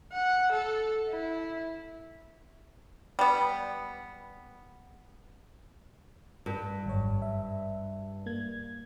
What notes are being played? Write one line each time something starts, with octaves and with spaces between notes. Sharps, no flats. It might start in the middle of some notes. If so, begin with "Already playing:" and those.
F#5
A4
E4
G3 B3
G2
G#1 F#2 C#5
E5
A#3 G#6